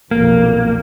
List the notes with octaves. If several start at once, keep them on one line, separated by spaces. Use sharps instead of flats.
B1 F2 A#2 A#3